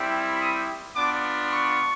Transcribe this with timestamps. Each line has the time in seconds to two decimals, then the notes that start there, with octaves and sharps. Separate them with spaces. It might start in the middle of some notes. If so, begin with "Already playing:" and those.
Already playing: G3 C4 E4
0.39 D#6
0.96 B3 D4 F4 D6
1.53 C#6